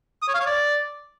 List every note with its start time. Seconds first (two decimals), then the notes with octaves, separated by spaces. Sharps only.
0.22 D#6
0.28 C#5
0.34 F5
0.40 C#5
0.46 D5